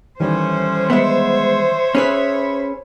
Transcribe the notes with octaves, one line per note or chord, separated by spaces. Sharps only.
A2 D#3 E3 G3 C#4 C5
G#3 B3 C#5 E5
C#4 G#4 B4 B5 B6